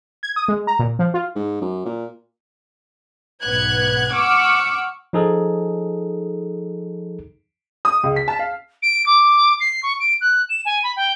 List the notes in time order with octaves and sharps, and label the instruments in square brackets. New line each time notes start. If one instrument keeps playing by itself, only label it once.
[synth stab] G#6
D#6
G#3
A#5
A#2
F3
F4
[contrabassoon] G#2
F#2
A#2
[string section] B1 G#2 B3 F#6 G#6
F#5 C#6 D6 E6 F6
[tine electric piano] F3 D#4 G#4 A4
[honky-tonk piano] D#6
C#2
B6
A5
F5
[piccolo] D7
D6
C7
C#6
D7
F#6
E7
G#5
B5
G5